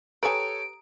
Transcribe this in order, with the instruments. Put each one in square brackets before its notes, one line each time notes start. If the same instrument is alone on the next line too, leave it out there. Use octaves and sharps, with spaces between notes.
[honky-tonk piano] G4 A4 C#5 [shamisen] B4 G#5 [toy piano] A#5 D#6 [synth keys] D7